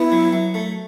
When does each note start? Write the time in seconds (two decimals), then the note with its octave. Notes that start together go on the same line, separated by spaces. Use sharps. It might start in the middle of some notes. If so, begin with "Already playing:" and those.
Already playing: B3 E4
0.12 F#3
0.32 F#3
0.54 A3